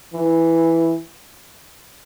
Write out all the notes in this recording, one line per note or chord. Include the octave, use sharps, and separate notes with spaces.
E3